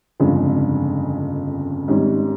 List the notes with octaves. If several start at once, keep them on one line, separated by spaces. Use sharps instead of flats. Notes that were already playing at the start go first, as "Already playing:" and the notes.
G1 F2 C#3 G#3
G#1 G#2 G3 C#4